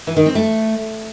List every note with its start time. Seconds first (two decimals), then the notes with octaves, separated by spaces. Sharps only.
0.07 E3
0.16 D#3
0.26 C4
0.35 A3